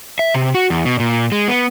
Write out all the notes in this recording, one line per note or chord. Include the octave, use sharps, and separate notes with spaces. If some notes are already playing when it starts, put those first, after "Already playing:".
E5
C3
F#4
E2
B2
A#2
G#3
B3